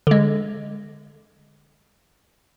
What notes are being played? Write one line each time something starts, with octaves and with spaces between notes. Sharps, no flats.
D3 G#3